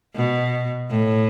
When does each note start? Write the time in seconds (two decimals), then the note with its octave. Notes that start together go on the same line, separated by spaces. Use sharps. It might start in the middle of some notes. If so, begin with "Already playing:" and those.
0.15 B2
0.90 A2